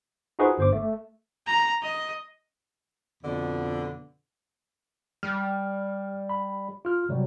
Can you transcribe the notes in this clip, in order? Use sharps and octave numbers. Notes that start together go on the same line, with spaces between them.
D#4 F4 F#4 G#4 B4 C5
G1 C5 D6
A3
A#5
D#5
F2 B2 D3
G3 F6
B5
F4 F6
C3 F#3 G3